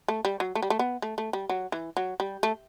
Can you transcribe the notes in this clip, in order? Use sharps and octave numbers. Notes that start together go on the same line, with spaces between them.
A3
G3
F#3
A3
G3
A3
B3
A3
A3
G3
F#3
E3
F#3
G3
A3